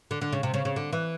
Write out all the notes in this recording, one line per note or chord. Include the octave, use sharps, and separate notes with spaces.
D3
D3
C#3
C3
C#3
C#3
D3
E3